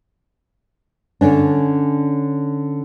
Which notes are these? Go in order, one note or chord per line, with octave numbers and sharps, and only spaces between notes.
D3 C#4 D4